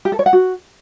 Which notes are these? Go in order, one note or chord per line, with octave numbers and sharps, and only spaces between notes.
G4
A4
C#5
F#5
F#4